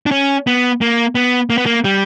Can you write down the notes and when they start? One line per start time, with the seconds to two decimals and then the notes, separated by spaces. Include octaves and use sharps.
0.06 D4
0.11 C#4
0.47 B3
0.81 A#3
1.15 B3
1.50 A#3
1.58 B3
1.66 A#3
1.84 G3